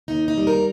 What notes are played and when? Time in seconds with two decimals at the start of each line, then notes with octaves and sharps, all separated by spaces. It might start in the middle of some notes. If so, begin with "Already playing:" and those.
0.08 D#2 D#4
0.28 D#4
0.38 G3
0.47 A#4